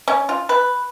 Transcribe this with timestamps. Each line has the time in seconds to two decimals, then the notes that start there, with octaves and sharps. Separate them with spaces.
0.08 C#4
0.29 F4
0.49 B4